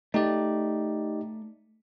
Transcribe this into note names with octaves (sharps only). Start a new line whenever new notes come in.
A3 D#4 G4 D5